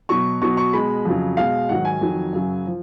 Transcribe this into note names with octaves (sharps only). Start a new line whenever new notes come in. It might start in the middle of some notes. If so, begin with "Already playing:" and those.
B2 F#3 C#6
B2 F#3 C#6
C#6
B2 G#3 B5
F2 C#3 F#3
B2 G#3 F5
G#2 D#3 F#3 F#5
G#5
F2 D#3 F#3
F#2 C#3 F#3
F3